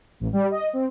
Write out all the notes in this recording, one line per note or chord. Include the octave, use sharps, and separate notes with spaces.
A1
G3
D#5
C4